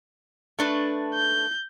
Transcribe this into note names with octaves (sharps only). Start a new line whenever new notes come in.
A3 D4 B4
G6